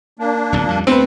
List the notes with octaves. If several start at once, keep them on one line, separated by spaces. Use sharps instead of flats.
A#3 D4
D1 B1 A#2
F2 G3
D2 A3 B3 C4 B4